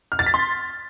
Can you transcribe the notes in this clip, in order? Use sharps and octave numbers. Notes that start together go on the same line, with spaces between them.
F6
A6
B6
C6